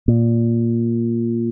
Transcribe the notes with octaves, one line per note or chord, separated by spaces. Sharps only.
A#2